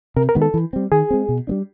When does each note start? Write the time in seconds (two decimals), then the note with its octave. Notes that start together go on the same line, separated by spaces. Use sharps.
0.16 C3 A#4
0.29 A#4
0.35 D#3 G#3 B3
0.42 A4
0.54 E3
0.73 G3 C4
0.92 D#3 G#4
1.11 G#3 C4
1.29 B2
1.47 G3 B3 D4